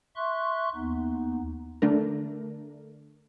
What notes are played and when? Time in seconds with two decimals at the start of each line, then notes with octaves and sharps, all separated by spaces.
0.16 E5 C6 C#6 F#6
0.75 D#2 B3 D#4
1.82 D3 A3 D4 A#4